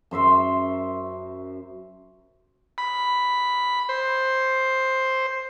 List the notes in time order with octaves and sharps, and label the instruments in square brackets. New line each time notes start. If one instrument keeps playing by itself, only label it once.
[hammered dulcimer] F#2 C5 E5 C6
[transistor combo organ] B5
C5